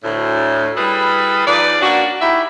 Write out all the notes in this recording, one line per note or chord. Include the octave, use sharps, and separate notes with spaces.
D2 A2
G3 E4 G#4 A4 B4
F3 D#4 G#4 B4 D5
A#3 C#4 D4 F#4
D#4 E4 F#4 G4 E5